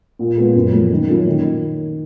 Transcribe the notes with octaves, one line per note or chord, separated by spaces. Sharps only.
A#2
G#3 B3 F4
F#2
F3 A#3
D#3
F#3 A#3 C#4 F4
D#3